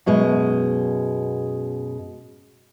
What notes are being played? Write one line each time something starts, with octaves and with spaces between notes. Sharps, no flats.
F#2 B2 G#3